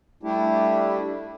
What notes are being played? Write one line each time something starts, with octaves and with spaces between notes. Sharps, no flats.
G3 A3 D4 E4 G4